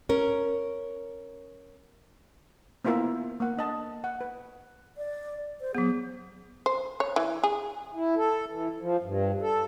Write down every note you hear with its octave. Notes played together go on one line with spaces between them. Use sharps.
C#4 A#4
A#3 B3 E4 F4 A#4 E5
A#3 F#5
D4 D#5 A5
F#5
B4
D5
C5
F#3 B3 G#4
C5
C#5
E3
G#4
E4
A4
E3
F3
G2
A4